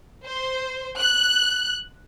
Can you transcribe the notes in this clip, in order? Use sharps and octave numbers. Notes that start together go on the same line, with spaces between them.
C5
F#6